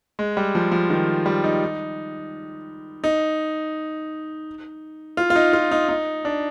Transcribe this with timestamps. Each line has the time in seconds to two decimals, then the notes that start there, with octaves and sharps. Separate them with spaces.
0.19 G#3
0.37 G3
0.55 F3
0.72 F3
0.90 D#3
1.26 G3
1.44 D#4
3.04 D#4
5.17 F4
5.30 F4
5.36 D#4
5.53 F4
5.71 D#4
5.89 D#4
6.25 D4